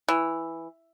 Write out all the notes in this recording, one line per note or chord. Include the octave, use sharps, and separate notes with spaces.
E3